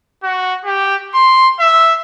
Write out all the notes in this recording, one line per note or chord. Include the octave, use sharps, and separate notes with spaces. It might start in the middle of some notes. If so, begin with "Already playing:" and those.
F#4
G4
C6
E5